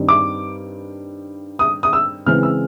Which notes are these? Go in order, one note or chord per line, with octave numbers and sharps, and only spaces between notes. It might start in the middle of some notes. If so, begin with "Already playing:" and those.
Already playing: G2 D#3 G3 C4
D6
D#6
D#6
E6
C#3 E3 G#3 C4 F6
E6